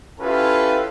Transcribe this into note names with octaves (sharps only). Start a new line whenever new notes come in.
C#4 E4 F4 G4 A4 B4